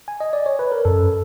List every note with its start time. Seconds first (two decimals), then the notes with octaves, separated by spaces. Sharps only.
0.08 G#5
0.20 D#5
0.33 D5
0.46 C#5
0.59 B4
0.72 A#4
0.85 F#2 A4